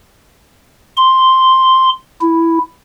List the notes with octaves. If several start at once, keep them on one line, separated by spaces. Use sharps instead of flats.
C6
E4